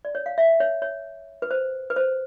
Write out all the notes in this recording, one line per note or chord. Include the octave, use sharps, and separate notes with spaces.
D5
C#5
F5
E5
C#5
C#5
B4
C5
B4
C5